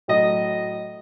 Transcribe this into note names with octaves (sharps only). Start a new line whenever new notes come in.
A2 F#3 D#5